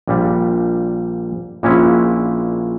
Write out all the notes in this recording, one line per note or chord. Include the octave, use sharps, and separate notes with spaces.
A#1 A#2 G3
A#1 A#2 G#3 C#4 E4